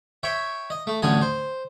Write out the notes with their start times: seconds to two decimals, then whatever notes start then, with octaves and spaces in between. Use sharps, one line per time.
0.23 C#5 E5 G5
0.70 D#5
0.87 A3
1.02 A1 D2 D3 F#3 G#5 D#6
1.21 C5